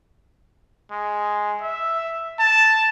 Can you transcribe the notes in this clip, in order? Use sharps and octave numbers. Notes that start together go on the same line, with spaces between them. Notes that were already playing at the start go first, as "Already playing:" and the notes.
G#3
E5
A5